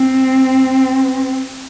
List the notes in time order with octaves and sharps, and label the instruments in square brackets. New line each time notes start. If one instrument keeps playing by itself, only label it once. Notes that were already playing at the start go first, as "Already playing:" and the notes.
Already playing: [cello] C4